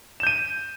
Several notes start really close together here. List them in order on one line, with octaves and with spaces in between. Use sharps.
E7 G6 D#7